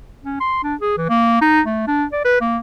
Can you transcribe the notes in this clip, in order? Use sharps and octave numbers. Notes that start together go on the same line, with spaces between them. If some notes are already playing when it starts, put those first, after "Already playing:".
C#4
C6
D4
G#4
E3
A#3
D#4
A3
D4
D5
B4
A#3